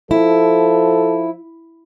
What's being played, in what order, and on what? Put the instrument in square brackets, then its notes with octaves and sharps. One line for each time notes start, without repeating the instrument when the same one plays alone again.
[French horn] F3 [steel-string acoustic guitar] E4 [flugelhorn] A4